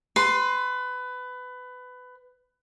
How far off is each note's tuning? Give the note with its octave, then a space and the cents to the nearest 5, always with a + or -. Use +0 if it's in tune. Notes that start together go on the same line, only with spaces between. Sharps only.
B4 +20 C6 +0